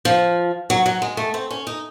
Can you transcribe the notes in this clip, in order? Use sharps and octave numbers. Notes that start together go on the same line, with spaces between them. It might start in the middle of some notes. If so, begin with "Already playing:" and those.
F3
F#3
F#3
G#3
A3
C4
C#4
D#4